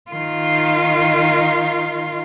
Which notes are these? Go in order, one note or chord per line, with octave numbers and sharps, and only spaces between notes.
D#3 F4